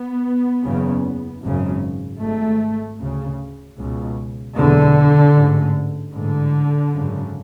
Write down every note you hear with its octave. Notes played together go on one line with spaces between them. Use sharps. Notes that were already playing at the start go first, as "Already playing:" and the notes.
Already playing: B3
F#1 E2 C#3
G#1 F#2 C#3
G#1 G#2 A3
D2 C#3
C#2 B2
F#1 E2 B2 D3
A1 G#2
A1 G#2 D3
G#1 F#2 C#3